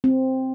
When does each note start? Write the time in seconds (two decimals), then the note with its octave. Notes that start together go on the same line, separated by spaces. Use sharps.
0.04 C4